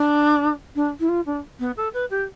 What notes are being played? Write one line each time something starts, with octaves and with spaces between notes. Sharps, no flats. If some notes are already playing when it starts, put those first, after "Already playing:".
Already playing: D4
D4
E4
F4
D4
B3
A4
B4
G4